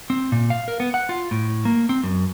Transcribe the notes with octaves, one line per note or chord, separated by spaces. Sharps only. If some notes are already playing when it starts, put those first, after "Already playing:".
C4
A#2
F5
A#4
B3
F#5
F4
A2
A#3
C4
F#2